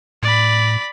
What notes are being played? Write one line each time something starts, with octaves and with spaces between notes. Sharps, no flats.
A2 D5 B5